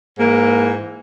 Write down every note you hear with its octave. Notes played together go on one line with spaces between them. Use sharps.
G#2 E3 A#3